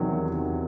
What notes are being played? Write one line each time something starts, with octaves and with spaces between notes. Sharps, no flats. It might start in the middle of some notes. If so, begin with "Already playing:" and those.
Already playing: E2 C3 D#3 F#3